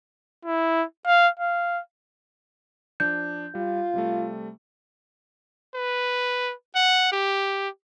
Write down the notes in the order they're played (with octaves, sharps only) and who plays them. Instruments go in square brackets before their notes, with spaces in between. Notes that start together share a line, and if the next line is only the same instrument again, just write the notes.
[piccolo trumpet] E4
F5
F5
[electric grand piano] F3 D4 [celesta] G6
[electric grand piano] G3 [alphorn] F4
[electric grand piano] C3 G3 A3
[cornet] B4
F#5
G4